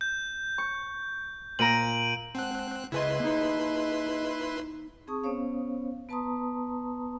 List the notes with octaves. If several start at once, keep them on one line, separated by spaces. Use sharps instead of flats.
G6
C#6
A#2 A#5 D7 D#7 F#7
G#3 C4 F#5 A5 F#6
C#2 E4 G#4 B4 D#5 G#5 C6
A#3 D#4
C4 G#4 A5 C#6 D#6
B3 C#4 C5 C#5 F5
B3 B4 A5 A#5 C6 D#6